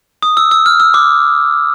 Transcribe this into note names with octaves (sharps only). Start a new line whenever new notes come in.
D#6
E6
E6
F6
E6
D6